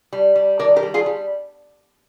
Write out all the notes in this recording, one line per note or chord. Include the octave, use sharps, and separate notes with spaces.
G3
G3
D#3 A#4 D5
G4 A#4
G3
F4 G#4
G3